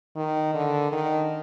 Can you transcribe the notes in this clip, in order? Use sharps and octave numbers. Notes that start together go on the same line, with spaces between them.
D#3
D3
D#3